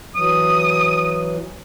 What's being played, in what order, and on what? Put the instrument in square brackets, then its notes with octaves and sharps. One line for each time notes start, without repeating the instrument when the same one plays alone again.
[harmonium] E3 F#3 [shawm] D#6